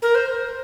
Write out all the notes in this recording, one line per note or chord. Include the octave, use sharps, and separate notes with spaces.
A#4
C5